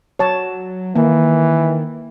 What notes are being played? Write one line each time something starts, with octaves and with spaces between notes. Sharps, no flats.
F#3 C#5 A5
D#3 E3 A#3